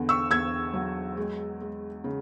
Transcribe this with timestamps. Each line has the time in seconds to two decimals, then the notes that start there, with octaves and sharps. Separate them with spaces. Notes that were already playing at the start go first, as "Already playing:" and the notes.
Already playing: E2 D3
0.09 C#6 E6
0.31 E2 E6 G#6
0.74 F#3
1.17 G#3
1.61 G#3
2.04 C#3